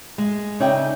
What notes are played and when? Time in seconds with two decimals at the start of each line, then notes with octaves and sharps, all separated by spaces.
0.18 G#3
0.60 C#3 D#4 C#5 D5 E5 G5